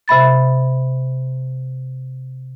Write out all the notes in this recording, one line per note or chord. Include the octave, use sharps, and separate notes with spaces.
C3 E5 B5 A6